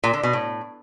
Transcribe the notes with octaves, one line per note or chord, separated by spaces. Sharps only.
A#2
D3
B2
A2